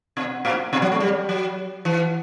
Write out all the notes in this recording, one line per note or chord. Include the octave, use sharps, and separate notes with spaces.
B2
A2
B2
F#3
A3
G3
F#3
E3